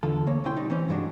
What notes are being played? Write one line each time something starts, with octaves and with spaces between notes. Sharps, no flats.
E2 D3 F4 A4
D2 A#3 C#5
B1 C3 C#4 E4 G5 C6
G3 D#4
E3 C4 C#4
G2 C3 F#3 G#3 D4 F#4